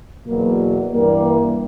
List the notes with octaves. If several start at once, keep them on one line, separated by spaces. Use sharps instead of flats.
E2 B2 F#3 A#3
G2 E3 G3 A#3